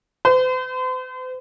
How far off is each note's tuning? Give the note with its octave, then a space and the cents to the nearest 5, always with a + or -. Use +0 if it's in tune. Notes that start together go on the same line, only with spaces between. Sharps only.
C5 -45